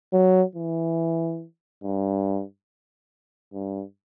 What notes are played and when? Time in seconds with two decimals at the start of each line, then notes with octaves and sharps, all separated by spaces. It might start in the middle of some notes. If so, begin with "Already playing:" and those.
0.13 F#3
0.55 E3
1.83 G2
3.53 G2